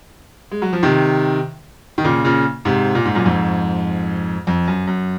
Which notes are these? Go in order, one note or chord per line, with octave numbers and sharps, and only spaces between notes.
G#3
F#3
F3
C3 D#3
D#3
A#2 C#3
A#2 C#3
G#2 C3
A#2
G#2
F#2 A#2
F2 G#2
F2
F#2
F#2